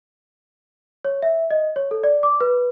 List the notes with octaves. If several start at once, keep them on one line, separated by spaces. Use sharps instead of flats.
C#5
E5
D#5
C#5
A4
D5
D6
B4